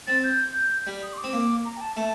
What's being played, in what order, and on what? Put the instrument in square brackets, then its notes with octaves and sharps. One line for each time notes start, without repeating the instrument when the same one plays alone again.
[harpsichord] C4 [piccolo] A6
[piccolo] G6
[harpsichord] G3
[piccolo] D#6
C6
D6
[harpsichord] C4
[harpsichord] A#3 [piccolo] D6
[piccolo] A#5
G5
A5
[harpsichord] A3 [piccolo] A5